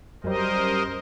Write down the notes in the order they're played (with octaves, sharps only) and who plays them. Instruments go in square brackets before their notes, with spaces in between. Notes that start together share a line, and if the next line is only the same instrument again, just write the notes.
[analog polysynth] F#2 G3 [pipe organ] A#4 C5 D#5